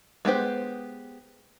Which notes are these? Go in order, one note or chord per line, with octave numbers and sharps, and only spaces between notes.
G#3 B3 G4 C5